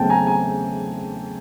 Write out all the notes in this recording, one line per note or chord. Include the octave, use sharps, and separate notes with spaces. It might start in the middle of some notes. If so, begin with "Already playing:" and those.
Already playing: E2 C#3 F#3 A3 C4 G5 A5
G#5 A#5
G#5 A#5